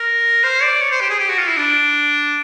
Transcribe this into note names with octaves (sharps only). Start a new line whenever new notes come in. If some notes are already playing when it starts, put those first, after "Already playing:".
Already playing: A#4
C5
D5
C#5
C5
G4
G#4
G4
F#4
F4
E4
D4